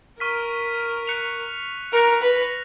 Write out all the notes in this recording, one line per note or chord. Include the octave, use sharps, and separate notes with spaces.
A#4 C#6 F6 B6 D#7
F#6 C#7 F7
A#4 F#6 A#6 C#7 F7
B4